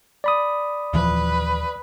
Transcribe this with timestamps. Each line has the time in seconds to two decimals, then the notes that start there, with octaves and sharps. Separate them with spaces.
0.24 D5 B5 D#6
0.93 D#1 E3 F3 B4